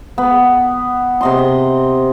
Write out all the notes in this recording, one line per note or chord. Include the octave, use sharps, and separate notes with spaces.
B3
C3 D#5 C6